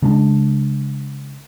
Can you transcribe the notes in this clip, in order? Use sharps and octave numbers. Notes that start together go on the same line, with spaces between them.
C#3 G#3 D4